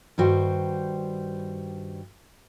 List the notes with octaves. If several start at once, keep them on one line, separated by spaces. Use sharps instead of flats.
G2 D#3 G3 F#4 C5 G5